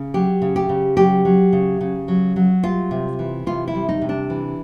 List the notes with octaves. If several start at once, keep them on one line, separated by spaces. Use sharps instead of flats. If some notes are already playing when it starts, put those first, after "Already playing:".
Already playing: C#3
F#3 G4
C#3
G4
C#3
F#3 G4
F#3
C#3
C#3
F#3
F#3
G3 F4
C3
E3
C3 F4
E4
G3
D#4
C3
D4
E3